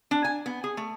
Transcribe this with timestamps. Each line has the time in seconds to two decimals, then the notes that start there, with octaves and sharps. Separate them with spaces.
0.11 D4
0.24 G#5
0.46 B3
0.64 G#4
0.77 A3